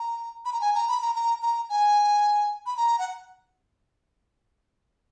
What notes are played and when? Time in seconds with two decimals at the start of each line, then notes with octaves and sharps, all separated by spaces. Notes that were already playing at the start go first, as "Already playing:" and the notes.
Already playing: A#5
0.45 B5
0.53 A#5
0.61 G#5
0.75 A#5
0.88 B5
1.02 A#5
1.15 A#5
1.42 A#5
1.70 G#5
2.66 B5
2.77 A#5
2.99 F#5